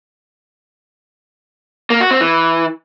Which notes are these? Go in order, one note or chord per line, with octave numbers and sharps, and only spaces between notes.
A#3
F#4
C4
E3